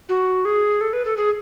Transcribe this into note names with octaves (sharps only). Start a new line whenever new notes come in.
F#4
G#4
A4
B4
A4
G#4